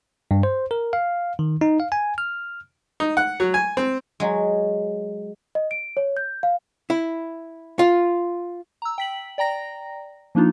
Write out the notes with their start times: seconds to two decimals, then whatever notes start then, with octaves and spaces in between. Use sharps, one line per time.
0.31 G2
0.43 C5
0.71 A#4
0.93 F5
1.39 D#3
1.61 D#4
1.80 F5
1.92 G#5
2.18 F6
3.00 D#4
3.17 F#5
3.40 F#3
3.54 G#5
3.77 C4
4.20 F#3 G#3
5.55 D#5
5.71 D7
5.97 C#5
6.17 G6
6.43 F5
6.90 E4
7.79 F4
8.82 A#5 E6
8.98 G5 B6 F#7
9.38 D5 G5 A#5 A#6
10.35 F3 A#3 D4 D#4 F4